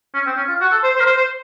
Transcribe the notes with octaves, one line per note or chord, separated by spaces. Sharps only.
C#4
C4
C#4
F4
F#4
A4
C5
C5
A#4
C5
C5